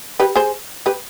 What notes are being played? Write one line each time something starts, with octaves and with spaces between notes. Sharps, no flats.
G4 B4
G#4 C5
G4 B4